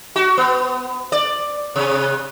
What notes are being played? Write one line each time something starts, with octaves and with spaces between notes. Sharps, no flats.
F#4
B3
D5
C3